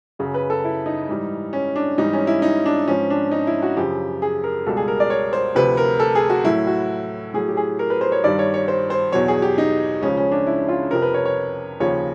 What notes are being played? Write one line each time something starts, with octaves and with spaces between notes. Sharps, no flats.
F#2 C#3 F#3
B4
A4
E4
D#4
G#2 E3 G3
C#4
D4
G#2 E3 G3 D#4
C#4
E4
D#4
D4
G#2 F3 C#4
D4
D#4
E4
F#4
F#2 C#3 F3 G4
G#4
A#4
C#2 B2 G3 A4
G#4
A#4
D5
C#5
C5
D2 C3 F3 B4
A#4
A4
G#4
F#4
A2 F#3 E4
F#4
A2 F#3 G#4
G4
G#4
A#4
B4
C5
C#5
G2 D#3 G3 D5
C#5
C#5
C5
C5
E2 B2 F#3 C#5
G#4
G4
D#4
C#2 C#3 F3 C#4
C#4
D4
E4
F4
F2 C3 F3 A#4
B4
C#5
C#5
D#2 C#3 F3 C#5